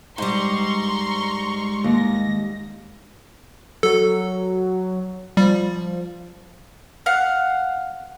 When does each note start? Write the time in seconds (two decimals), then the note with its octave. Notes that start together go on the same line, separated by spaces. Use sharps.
0.18 G#2 G3 G#3 A#5 C6 C#6
1.84 D#2 A#6
3.83 F#3 A4
5.37 F3 G3
7.06 F5 F#5